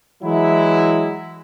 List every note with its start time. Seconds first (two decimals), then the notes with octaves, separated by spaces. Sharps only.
0.23 E3 F#3 G#3 E4